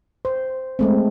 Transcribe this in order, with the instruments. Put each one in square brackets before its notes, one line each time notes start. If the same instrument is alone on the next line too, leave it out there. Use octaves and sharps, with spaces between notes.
[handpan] C5
G#3 A3 C4